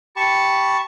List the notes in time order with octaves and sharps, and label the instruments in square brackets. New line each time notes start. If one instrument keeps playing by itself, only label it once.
[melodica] G4 B5 [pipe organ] A5 C#6